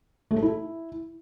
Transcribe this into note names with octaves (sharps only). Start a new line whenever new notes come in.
A3
A4
E4